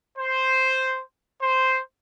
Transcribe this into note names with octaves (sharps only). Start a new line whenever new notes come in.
C5
C5